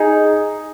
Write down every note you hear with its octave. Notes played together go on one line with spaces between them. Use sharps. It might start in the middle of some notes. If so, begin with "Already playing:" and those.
Already playing: D#4 G#4